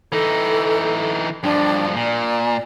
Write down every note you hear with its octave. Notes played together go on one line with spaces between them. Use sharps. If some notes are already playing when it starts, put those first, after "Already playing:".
E3 D#4 A4
G2 F3 D4
A#2 D5